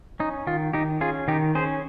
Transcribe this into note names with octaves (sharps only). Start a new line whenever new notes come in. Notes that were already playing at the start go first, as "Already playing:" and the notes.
C#4 D#4
D#3 F4
D#3 D#4 G4
C#4 F4 G#4
D#3 D#4 G4
C#4 G#4 C5